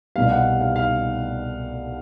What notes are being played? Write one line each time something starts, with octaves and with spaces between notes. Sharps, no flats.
C2 B2 G3 F5
F#5
F5
F5